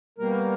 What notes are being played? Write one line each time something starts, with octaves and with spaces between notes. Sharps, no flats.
B2 G3 A#3 A#4